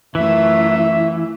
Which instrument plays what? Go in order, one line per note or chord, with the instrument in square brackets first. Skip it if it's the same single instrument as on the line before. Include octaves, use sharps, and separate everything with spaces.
[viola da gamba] F#2 A3 F4 [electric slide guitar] E3 [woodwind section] E5